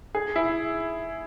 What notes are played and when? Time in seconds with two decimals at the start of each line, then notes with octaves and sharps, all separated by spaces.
0.15 G#4
0.36 E4